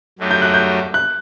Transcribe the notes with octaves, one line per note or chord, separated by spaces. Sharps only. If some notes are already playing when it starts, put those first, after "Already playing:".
F#2 F#3 A3 D#4 G4
G6
F#6
G6
F#6